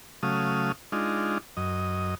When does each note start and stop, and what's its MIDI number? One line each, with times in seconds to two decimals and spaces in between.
0.23 0.72 49
0.23 0.72 54
0.23 0.72 57
0.23 0.72 77
0.23 0.72 87
0.92 1.38 56
0.92 1.38 62
0.92 1.38 63
0.92 1.38 65
1.57 2.15 42
1.57 2.15 75